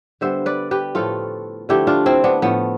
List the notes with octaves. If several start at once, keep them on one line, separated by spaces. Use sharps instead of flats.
D3 G3 B3 C5 E5
B4 D5
G4 B4
A2 F3 A3 F4 A4
D3 F3 A3 E4 G4
D4 F4
C4 E4
B3 D4
A2 F3 A3 B3